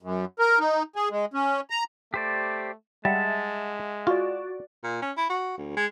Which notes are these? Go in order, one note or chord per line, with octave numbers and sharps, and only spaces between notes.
F#2
A#4
D#4
G#4
G#3
C#4
A#5
A3 G4 C5 D5
G3 G#3 E5 F#5 A5
F4 F#4 D5
A#2
C#4
E4
F#4
D2
G#3